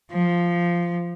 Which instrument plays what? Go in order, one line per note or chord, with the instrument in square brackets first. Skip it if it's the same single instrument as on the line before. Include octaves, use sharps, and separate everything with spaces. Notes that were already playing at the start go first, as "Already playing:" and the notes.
[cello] F3